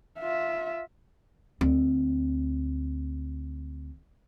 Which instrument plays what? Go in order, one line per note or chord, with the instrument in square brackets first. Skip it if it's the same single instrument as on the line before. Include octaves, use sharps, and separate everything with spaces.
[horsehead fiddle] F4 E5
[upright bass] D2 C4